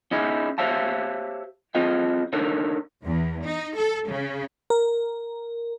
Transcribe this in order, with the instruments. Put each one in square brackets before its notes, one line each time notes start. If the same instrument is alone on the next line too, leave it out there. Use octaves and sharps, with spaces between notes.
[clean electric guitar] C#4 D#4 E4 G#4
G4 C5 C#5 E5 F5 A5
C4 F4 G#4 D#5 G5
D4 D#4 A4 A#4 C#5
[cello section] E2
D#4
A4
C#3
[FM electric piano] A#4